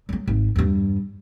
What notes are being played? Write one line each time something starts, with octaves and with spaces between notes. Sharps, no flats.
F#3 G#3
G#1
E2 G2